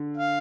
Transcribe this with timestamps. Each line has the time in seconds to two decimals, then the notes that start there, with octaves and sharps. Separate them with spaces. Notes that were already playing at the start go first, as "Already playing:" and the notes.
Already playing: D3
0.17 F5